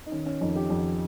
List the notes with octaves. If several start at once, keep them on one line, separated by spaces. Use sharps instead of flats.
D#4
D#3 C#4
C#4
F2 D#4
G4
F2